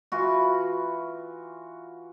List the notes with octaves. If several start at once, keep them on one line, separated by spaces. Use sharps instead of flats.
E3 F4 F#4